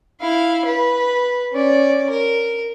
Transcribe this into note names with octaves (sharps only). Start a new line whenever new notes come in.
E4 F5
B4
C#4 D5
A#4